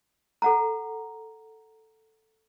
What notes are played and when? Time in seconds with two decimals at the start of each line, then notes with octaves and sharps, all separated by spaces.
0.42 A4 F#5 A#5